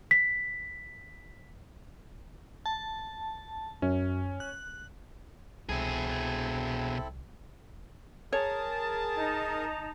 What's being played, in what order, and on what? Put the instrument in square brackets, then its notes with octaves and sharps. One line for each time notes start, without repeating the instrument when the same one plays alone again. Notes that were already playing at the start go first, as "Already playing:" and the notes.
[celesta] B6
[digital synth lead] A5
[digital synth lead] F#2 [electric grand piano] C#4
[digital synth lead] F#6
[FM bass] C2 [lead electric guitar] B2 G#4 [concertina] C4 E4 A4
[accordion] G#4 A#4 [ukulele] C#5 [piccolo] A5
[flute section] D#4 A#5